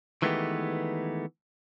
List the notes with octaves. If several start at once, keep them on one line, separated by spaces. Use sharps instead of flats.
D#3 E3 G#3 A3 B3 G4